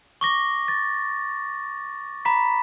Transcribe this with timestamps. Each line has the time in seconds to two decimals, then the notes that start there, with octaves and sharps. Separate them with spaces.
0.21 C#6 D6 A#6
0.68 A6
2.25 A#5 B5 B6